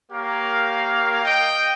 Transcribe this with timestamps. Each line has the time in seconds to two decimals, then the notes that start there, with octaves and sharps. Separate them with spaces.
0.11 A#3 G4 A#4 C#5 F5
1.23 D#5 G5